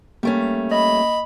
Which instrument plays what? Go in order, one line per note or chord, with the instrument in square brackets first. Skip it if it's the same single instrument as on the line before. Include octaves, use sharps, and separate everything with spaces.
[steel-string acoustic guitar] G3 A3 C#4 [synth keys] A#3
[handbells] D#5 [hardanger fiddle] B5